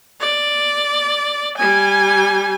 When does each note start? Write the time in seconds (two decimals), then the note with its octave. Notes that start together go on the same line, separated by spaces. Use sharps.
0.20 D5
1.57 G3 G#5